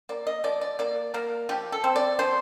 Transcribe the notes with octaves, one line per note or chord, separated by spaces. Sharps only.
A#3 D5
D#5
F3 D5
D5
A#3 D5
A#3 A#4
F3 G4
A4
C4
D5
F3 C5